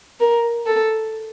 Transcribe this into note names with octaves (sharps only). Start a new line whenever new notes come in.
A#4
A4